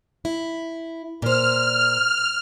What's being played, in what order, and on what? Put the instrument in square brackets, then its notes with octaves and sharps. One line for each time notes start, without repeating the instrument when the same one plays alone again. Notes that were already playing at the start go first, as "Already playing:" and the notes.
[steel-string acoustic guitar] E4
[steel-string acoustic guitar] A#2 C5 [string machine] F6